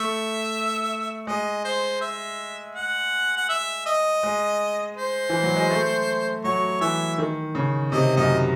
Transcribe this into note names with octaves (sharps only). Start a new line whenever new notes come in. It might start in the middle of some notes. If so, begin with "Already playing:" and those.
Already playing: A3 E5
G#3 D#5
C5
E5
F#5
F#5
E5
D#5
G#3
C5
E3
F#3
G#3
A3
F#3 C#5
E3 E5
D#3
C#3
C3 D#5
F#2 D#5